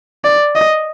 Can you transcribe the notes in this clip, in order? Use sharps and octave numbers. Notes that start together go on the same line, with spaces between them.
D5
D#5